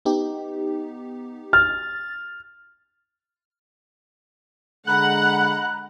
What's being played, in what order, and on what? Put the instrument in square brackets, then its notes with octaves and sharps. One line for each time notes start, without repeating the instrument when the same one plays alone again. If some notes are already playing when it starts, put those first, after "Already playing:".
[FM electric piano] B3 D#4 G4
[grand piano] F6 [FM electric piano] A6
[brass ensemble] D3 G#3 [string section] F#5 [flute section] A#5 B5 [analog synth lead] F#6